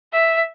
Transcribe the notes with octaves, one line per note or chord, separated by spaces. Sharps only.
E5